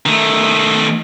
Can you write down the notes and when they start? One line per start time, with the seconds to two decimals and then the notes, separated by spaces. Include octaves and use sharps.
0.06 D#3 A3